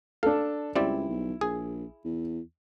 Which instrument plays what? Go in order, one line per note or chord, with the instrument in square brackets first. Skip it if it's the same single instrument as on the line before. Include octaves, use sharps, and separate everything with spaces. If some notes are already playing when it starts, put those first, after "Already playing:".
[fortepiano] D4 A4 [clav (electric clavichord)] F5
[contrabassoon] C#2 [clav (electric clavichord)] G3 C4 D5 [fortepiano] E4
[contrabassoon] B1
[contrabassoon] A#1 [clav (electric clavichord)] G#4
[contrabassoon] E2